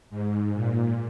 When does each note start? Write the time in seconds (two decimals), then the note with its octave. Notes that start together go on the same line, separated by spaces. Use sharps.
0.10 G#2
0.54 A#2